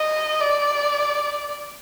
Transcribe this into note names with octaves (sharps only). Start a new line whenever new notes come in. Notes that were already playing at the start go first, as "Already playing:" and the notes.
Already playing: D#5
D5